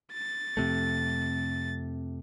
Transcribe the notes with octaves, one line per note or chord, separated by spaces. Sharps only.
A6
F2 C3 A3